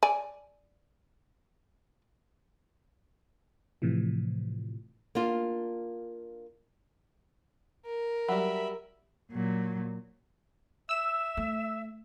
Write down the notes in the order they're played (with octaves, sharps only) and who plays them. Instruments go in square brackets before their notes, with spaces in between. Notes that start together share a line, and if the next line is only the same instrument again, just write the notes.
[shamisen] D5 G#5
[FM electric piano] A2 C3 E3 F3
[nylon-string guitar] A#3 D4 F4
[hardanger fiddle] A#4
[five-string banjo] F#3 G3 [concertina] E5 B5
[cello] A#2 F#3
[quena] E5 [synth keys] E6 E7
[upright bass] A3